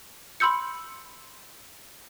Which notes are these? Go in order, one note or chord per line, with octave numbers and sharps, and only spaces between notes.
B5 C6 E6 G6 C#7